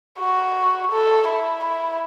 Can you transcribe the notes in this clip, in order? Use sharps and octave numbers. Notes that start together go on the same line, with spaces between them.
F#4
A4
E4
E4